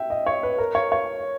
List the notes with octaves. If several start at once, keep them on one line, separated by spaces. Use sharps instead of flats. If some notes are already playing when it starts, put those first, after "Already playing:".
Already playing: E5 G5
D#5
C#5
B4
A#4
C#5
C#5